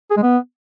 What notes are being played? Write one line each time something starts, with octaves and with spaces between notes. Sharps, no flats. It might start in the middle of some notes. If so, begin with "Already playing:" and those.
G#4
G#3
B3